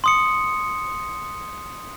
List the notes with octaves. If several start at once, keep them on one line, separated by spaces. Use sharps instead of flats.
C6 D#6 C#7